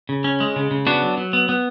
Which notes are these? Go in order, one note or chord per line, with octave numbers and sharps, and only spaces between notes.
C#3
C#4
G#3
C#3
C#3
B3 D4 F#4
F#3
F#3
B3
B3